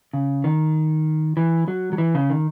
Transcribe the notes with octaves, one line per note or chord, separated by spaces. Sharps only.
C#3
D#3
E3
F#3
F#3
E3
C#3
D#3